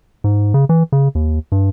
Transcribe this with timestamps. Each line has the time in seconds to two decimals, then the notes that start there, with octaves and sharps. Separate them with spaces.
0.24 G#2
0.54 C#3
0.69 E3
0.92 C#3
1.15 D#2
1.52 G2